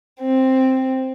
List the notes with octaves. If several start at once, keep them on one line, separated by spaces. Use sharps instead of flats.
C4